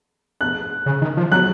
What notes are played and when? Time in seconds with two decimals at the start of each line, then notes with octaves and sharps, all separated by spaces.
0.41 F#6
0.86 C#3
1.02 D#3
1.17 F3
1.31 F#3 F#6